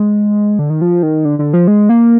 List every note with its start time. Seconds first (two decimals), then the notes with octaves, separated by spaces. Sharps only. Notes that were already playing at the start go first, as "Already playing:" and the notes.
Already playing: G#3
0.59 D3
0.70 D#3
0.81 F3
1.03 D#3
1.25 D3
1.39 D3
1.53 F3
1.68 G#3
1.89 A#3